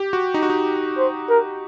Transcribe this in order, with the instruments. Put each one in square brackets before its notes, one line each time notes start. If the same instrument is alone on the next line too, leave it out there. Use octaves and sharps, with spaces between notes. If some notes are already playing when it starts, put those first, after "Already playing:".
Already playing: [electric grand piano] G4
F#4
D#4
F#4
D#4
[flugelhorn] C5
A#4